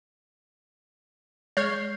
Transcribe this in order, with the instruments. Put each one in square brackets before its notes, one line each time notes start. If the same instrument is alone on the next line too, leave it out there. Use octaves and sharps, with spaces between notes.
[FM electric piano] G#3 G6 C7 [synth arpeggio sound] C#5 F6 G#6